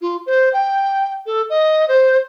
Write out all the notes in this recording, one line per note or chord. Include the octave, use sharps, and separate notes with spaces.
F4
C5
G5
A4
D#5
C5